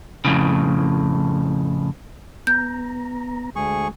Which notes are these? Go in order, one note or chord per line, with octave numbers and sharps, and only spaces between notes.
F2 A2 C#3
B3 A#5 G6
D2 G#3 G#4 C#6